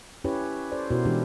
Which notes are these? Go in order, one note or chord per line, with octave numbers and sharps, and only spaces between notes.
C#4 E4 G4 B4 C#5
A4 C5 D5
B2 E4 F#4 A#4 C5
E3 G#3 D4 E4 G4